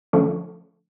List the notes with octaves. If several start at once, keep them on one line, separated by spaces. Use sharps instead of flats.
D3 F3 A3 C#4